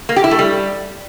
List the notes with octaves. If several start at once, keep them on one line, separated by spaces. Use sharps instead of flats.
A#3
G4
E4
A3
G3